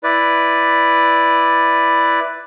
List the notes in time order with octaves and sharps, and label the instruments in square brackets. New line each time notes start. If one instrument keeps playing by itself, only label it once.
[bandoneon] E4 B4 D5